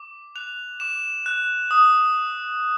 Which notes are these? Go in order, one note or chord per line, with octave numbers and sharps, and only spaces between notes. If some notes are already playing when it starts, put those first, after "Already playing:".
Already playing: D6
F#6 F7
D6 E7
F#6
D#6